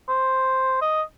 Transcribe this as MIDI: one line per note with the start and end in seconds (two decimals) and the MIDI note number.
0.09 0.79 72
0.82 1.02 75